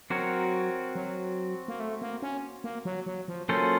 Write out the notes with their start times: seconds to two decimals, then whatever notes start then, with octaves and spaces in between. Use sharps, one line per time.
0.10 F#3 C4 F#4 A#4 C#5
0.95 F#3
1.68 A#3
1.80 A3
2.02 A#3
2.22 C#4
2.64 A#3
2.85 F#3
3.06 F#3
3.28 F3
3.49 F#3 A#3 C#4 F4 A4 C5